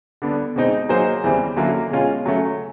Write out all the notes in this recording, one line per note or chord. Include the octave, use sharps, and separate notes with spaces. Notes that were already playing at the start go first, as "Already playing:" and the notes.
D3 G3 B3 D4
B2 G#3 C4 D#4
F#3 A#3 D#4 G#4 C5
E2 C#3 E3 G3 C4
D3 F#3 A#3 C#4 E4
B2 G#3 C#4 F4
C#3 F#3 A3 C#4